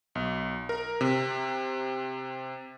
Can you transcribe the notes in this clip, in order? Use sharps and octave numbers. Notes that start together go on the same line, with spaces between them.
B1
A#4
C3